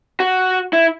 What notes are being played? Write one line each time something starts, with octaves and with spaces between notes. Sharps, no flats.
F#4
E4